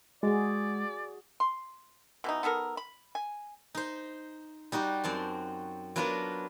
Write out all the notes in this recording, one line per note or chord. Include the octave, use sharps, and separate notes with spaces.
G#3 F#4 G#4 D5
C6
B2 E3 D#4
B3 D#4 A4 A#4
B5
G#5
D#4 C5
G3 D#4 F#4 G4
F#2 C4 A5 C6
F#3 B3 D4 F4 A#4 B4